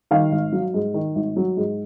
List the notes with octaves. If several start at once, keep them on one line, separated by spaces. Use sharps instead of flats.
D#3 F5
G#1
F#3
G#2
D#3
G#1
F#3
G#2